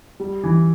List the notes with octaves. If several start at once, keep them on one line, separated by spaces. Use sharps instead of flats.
G3
E3